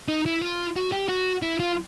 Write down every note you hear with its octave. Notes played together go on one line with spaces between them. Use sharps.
D#4
E4
F4
F#4
G4
F#4
E4
F4